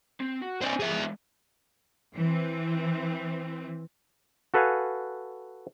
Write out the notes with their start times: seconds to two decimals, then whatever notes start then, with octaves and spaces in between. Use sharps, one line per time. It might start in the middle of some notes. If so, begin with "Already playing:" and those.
0.20 C4
0.41 F#4
0.61 C4 D4 C5 G#5
0.80 C2 G#4 E5
0.92 E3 G#3
2.15 E3 C4
4.54 F#4 A4 B4 F5 F#5 G#5